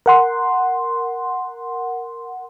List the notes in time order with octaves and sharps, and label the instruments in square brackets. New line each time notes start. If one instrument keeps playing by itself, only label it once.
[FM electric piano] A#4 F#5 C6